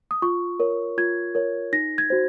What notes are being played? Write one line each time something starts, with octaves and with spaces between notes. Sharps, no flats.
D#6
F4 C#6
A#4 C#5
F4 G#6
A#4 C#5
D#4 A#6
G#6
F#4 C5